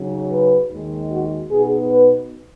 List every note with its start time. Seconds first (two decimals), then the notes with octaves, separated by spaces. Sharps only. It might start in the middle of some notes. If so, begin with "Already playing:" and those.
Already playing: C#3 F#3 D#4
0.31 B4
0.71 D#2 D#3 G#3
1.11 F#4
1.51 B2 B3 D#4 G#4
1.90 B4